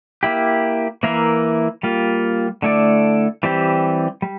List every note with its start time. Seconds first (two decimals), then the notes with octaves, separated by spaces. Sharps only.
0.23 A#3 E4 G4
1.03 E3 A#3 E4 A#4 F5
1.83 G3 A#3 F4
2.62 D3 A3 E4 A4 D5
3.43 E3 G3 C4 G4
4.22 G3